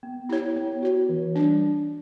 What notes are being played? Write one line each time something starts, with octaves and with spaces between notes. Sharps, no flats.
B3
E4 G4 C#5
B3
F#4 C#5
E3
G3 D4